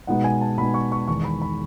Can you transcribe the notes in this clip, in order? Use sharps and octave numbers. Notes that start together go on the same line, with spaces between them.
B2 G#3 B3 D#4 F#5
G#5
A5
B2 G#3 B3 D#4 B5
C#6
C#6
E2 D#3 G#3 D#4 C#6
B5
B5